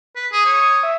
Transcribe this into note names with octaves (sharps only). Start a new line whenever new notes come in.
B4
G#4 D#6
C#5
E5